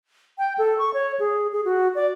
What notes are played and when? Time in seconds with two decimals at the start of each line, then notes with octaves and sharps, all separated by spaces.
0.38 G5
0.58 A4
0.79 C#6
0.94 C#5
1.20 G#4
1.53 G#4
1.65 F#4
1.95 D5